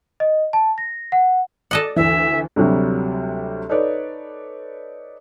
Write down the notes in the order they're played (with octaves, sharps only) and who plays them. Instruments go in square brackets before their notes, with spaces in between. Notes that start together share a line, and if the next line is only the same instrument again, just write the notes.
[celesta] D#5
A5
A#6
F#5
[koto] A4 D#5 F#5 [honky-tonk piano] D5
[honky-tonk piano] D2 E3 [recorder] E5
[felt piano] D2 C3 F#3 G3
D#4 A4 B4 C#5 D5